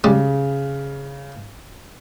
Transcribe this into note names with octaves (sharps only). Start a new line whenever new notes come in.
C#3 G3 G#3